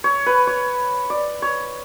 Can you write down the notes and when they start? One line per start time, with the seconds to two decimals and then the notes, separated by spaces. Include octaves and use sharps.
0.04 C#5
0.26 B4
0.47 C#5
1.10 D5
1.42 C#5